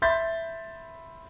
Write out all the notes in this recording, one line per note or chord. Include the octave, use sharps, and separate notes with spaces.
E5 B5 C6 G6 A6 B6